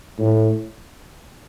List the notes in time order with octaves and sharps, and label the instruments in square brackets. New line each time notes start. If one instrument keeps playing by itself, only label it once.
[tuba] A2